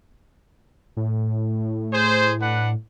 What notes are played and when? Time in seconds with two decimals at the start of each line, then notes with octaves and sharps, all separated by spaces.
0.97 A2
1.93 G#4 C5
2.42 D4 B4 F#5